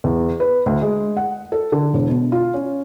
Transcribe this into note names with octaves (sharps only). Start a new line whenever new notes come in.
E2
B4
D2
G#3
F#5
A4
D3
E1
B2
F4
C#4